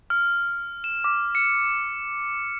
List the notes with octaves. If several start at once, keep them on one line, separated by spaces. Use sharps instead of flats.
F6
E7
D6
C#7